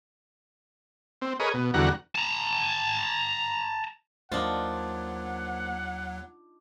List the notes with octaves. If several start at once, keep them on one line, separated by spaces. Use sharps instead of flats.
C4
G#4 A#4 B4 C#5 D#5
B2
E2 D3 G3 F#4 F#5 A#5
A5 A#5
D#2 F#3 A#3 D4 D#4 F4 C5 F#5